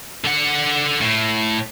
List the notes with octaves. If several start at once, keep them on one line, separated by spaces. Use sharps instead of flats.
D3 F#5
A2